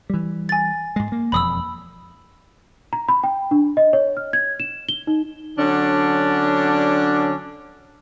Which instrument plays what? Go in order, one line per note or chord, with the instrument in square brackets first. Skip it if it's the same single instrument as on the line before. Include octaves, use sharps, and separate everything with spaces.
[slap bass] E3 G3
[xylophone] G#5 A6
[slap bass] G#2 G#3
A#3
[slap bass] E1 F2 [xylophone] B5 D#6 E6
[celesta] A#5
B5
G5
D4
D#5
C#5
F6
G#6
E7
G7
D#4
[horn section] D3 F#3 C#4 D4